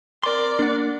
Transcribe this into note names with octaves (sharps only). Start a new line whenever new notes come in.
C4 A#4 D5 C6
A#3 D4 F#5